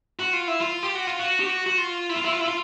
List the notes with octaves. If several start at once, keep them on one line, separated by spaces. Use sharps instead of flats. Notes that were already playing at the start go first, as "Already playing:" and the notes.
F#4
F4
E4
F4
G4
F#4
F4
F#4
G4
F#4
F#4
F4
E4
F4
E4
F4
E4
F4